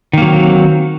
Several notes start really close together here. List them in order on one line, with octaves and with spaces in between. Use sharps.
D#3 A#3 F#3 C4